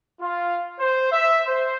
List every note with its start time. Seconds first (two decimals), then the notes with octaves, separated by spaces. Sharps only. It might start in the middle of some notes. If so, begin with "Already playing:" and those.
0.20 F4
0.79 C5
1.12 E5
1.46 C5